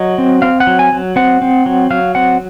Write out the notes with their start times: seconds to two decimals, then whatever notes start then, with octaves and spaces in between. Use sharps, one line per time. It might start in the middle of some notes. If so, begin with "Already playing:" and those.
Already playing: F#3 D#5
0.18 C4
0.42 C4 F5
0.60 F#5
0.67 F#3
0.79 G#5
0.92 F#3
1.16 C4 F#5
1.42 C4
1.66 F#3
1.90 F#3 F5
2.15 C4 F#5